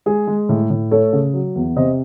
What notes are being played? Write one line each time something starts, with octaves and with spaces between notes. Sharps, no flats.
G#3 G#4
G#3
A2
A2
A3 A4 C#5
C#3
F#3
E2
C3 C5 D#5